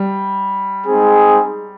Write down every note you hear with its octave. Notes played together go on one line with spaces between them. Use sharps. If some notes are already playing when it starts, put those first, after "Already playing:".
Already playing: G3
G#3 C4 D#4 G#4